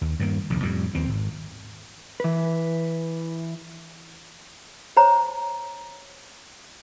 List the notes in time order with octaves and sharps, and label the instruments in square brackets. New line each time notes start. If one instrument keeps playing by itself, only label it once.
[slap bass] D#2
G2 D#3 A3 A#3
F1 A#1 D#2
F2 A2 G3
D#2 C4
G#1
[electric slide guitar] E3 B4
[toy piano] C5 C#5 A#5